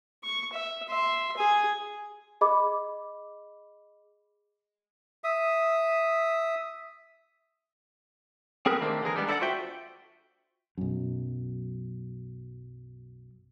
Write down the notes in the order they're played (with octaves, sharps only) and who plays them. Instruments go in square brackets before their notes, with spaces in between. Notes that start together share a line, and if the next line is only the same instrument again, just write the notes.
[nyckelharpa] C#6
E5
E5 C6
G#4 G#5
[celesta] G#4 D#5 B5 D6
[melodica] E5 D#6
[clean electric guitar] C4 G#4 A#4 B4
D#3 A3 A#3 C4 D4
D3 E3 G#4 A#4
G3 G#3 B3 D4
D4 E4 A4 A#4 D5 F#5
F4 F#4 C5 E5 G5
[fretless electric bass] B1 F#2